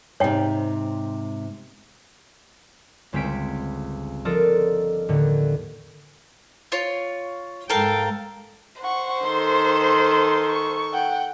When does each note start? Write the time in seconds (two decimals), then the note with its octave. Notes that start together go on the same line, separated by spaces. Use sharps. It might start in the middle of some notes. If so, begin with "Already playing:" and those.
0.20 G#2 C3 C#5 G5
3.12 G1 C#2 C4 C#4 B6 D7
4.25 F3 D4 F4 A4 A#4 D#5
5.09 D#2 A2 D3
6.72 F4 C#5
7.70 G#2 A4 A#4 F5 G5
8.82 C5 F#5 C#6
9.25 D#3 A4 C6
10.52 C#6
10.93 F#5 G5